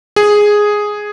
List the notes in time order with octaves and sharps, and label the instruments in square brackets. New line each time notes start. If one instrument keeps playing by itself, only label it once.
[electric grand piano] G#4